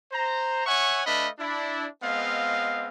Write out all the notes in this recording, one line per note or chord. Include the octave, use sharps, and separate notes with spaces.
C5 A#5
C#5 E5 F#5 G#5 C#6
A3 D4 B4 D#5 F5 B5
D4 E4
G#3 B3 C4 D#5 F5